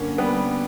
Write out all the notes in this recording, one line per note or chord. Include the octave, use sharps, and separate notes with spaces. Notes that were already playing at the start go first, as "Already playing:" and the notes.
Already playing: G2 D3 A#3 C#4
G3 B3